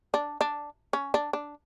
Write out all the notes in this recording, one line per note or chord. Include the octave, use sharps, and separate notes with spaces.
D4
D4
C#4
D4
D4